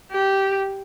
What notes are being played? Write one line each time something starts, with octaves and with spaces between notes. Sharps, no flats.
G4